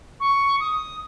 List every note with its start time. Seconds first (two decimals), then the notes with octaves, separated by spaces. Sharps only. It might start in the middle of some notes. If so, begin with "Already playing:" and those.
0.20 C#6
0.60 D#6